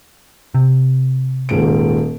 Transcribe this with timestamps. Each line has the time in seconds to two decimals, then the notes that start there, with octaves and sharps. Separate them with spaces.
0.54 C3
1.49 D#1 G#2 D7